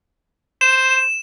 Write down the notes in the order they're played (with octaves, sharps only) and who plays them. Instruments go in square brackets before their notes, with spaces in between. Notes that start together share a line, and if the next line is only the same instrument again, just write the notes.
[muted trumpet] C5 [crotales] E7